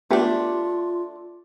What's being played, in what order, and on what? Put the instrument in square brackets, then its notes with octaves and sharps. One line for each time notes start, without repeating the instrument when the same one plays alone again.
[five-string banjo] A3 D4 [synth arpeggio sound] B3 G4 [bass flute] F4